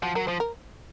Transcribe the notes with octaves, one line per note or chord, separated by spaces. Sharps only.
F3 F#4
F#3 A#4
F3 C5
A#4